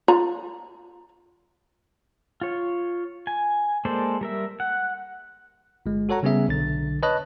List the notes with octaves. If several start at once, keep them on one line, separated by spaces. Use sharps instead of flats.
F4 A#5
F4 C#5
G#5
G#3 A#3 A4 C5 D5
G3 A#4 E5
F#5
G1 G#3
F#4 A4 C#5 F#5 A#5
C#3 G3 B3 C#4 G#4 E5
B1 D3 A6
B4 C#5 D#5 A5 F#6